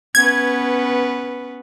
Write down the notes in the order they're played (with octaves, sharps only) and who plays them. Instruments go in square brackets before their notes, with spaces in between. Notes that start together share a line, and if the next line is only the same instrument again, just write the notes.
[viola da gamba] B3 C#4 B4 [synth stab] G#6